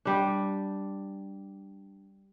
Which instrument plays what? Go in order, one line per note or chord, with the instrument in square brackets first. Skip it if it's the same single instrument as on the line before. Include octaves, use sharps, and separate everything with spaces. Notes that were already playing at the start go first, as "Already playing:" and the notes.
[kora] G3 D4